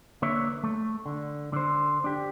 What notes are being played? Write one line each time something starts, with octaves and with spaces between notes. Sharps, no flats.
D3 A#3 B4 C#5 E5
A3
D3
D3 C5
D4 G4